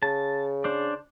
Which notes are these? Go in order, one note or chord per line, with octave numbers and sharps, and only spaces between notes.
C#3 A5
D4 C5 D5